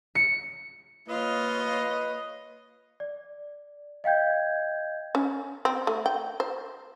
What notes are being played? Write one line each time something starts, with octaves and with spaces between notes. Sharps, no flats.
C#7
A#3 F4 B4 C#5 D#5
D5
D#5 F5 G5 G6 G#6
C#4
C4
A3
G5
C5